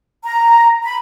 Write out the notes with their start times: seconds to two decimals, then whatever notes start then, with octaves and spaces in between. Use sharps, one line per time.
0.24 A#5
0.83 B5